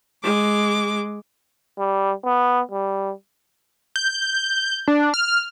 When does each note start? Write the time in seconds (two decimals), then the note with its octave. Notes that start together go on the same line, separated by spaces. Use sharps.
0.23 G#3 D6
1.79 G3
2.25 B3
2.72 G3
3.96 G6
4.88 D4
5.14 F6